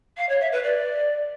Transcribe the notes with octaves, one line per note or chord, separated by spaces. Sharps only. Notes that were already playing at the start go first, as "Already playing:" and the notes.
F5
C#5
E5
B4
D5